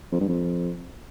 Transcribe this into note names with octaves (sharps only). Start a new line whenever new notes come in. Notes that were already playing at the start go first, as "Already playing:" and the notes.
F2
G2
F2